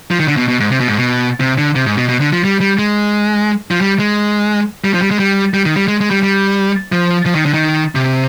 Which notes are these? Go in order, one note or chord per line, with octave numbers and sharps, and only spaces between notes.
F3
D#3
D3
B2
B2
G#2
C3
B2
G#2
B2
C3
D3
C3
G#2
B2
B2
D3
F3
G3
G3
G#3
F3
G3
G#3
G3
F3
G3
G#3
G3
G3
D#3
G3
G#3
G#3
G3
G3
F3
F3
D#3
D3
D#3
C3